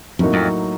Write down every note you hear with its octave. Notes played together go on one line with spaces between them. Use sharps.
F2 A2 F#3 A#3 D#4 F#4
F2